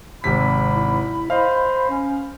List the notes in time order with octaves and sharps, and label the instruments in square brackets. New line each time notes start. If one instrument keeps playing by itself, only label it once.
[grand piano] G#1 C3 B6 [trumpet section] B5
[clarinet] E4
[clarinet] C5 [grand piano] D#5 F5
[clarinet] C#4